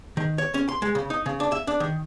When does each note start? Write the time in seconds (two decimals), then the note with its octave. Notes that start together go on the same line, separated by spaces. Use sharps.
0.17 D#3
0.38 C#5
0.54 C#4
0.69 C6
0.82 G#3
0.95 C#3
1.10 D#4
1.26 C#3
1.40 D4
1.52 E5
1.67 D4
1.80 D#3